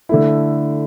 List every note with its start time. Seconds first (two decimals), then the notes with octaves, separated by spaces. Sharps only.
0.09 D3 A3 E4